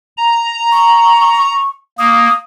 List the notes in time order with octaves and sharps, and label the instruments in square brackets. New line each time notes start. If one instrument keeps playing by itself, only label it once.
[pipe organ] A#5
[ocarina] C#6
[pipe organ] A#3 [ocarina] D#6